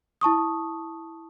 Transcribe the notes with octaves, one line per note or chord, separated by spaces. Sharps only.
E4 A5 C#6 D#6